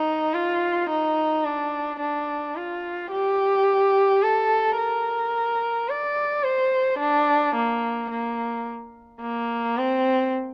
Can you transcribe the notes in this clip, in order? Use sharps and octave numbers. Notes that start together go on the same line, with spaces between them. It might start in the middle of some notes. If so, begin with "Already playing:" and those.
Already playing: D#4
F4
D#4
D4
D4
F4
G4
A4
A#4
D5
C5
D4
A#3
A#3
A#3
C4